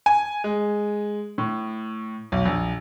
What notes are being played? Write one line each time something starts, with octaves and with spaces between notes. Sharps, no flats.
G#5
G#3
A2
B1
A#1